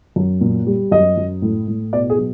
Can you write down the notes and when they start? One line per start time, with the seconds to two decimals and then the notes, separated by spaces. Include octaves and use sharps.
0.16 F#2
0.41 A#2
0.66 G3
0.91 F#2 D#5
1.17 F#2
1.42 A2
1.68 A2
1.93 B2 D5
2.10 G#4
2.18 F#3